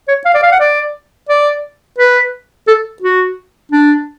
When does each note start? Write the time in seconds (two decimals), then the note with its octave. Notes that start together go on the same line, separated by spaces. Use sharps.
0.08 C#5
0.25 F5
0.34 D5
0.43 F5
0.52 F#5
0.60 D5
1.29 D5
1.98 B4
2.68 A4
3.02 F#4
3.72 D4